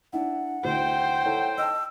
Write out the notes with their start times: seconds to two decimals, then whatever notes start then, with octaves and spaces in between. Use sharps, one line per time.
0.13 D4 E4 F#5
0.64 D2 E4 C5 G5
1.25 E4 A4 C#5
1.58 D#5 A5 E6